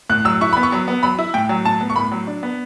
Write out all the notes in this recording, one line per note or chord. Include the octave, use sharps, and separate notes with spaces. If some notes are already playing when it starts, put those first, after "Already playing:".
A2 F#6
F#3 E6
E4 C#6
B3 B5
C#6
F#3
B3
F#3 B5
E4
A2 G5
F#3
A2 A5
B3
C#6
A2 B5
F#3
D4
B3